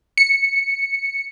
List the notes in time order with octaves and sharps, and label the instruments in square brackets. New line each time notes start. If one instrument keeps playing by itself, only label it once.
[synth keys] C#7